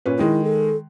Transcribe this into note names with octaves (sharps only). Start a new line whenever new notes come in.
A#2 C#4 B4
D#3 G#3 E4
A4